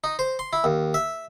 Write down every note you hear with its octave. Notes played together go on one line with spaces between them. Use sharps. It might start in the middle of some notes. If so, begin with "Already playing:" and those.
D#4
C5
C6
E4
D#2
E5